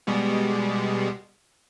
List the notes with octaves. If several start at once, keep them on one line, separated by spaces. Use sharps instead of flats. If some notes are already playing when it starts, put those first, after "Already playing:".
B2 G3 G#3